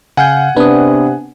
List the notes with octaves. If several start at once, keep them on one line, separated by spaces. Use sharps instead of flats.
C#3 F5 F#5 G#5 G6
C3 B3 D4 B4 D#6